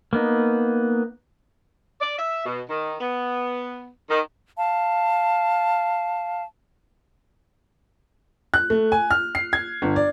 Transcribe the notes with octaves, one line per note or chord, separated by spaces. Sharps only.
A#3 B3 D#4
D5
E5
B2
D#3
B3
D#3
F5 A5
F#6
A3
G#5
F6
C7
G#6
G1
D5